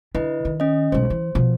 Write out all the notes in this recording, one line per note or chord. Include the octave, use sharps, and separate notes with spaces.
D3 E4 B4 D#5
D#3
C#4 D#5
B1 G#3 C5
E3
B2 F3